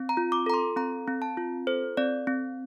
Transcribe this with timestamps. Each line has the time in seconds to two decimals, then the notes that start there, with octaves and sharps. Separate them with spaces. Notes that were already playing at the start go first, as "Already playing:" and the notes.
Already playing: C4
0.09 A#5
0.17 F4
0.32 D6
0.46 A4 A#5
0.54 C6
0.76 C4 A#5
1.08 C4
1.22 A5
1.37 F4
1.67 A4 C5
1.97 C4 D5
2.27 C4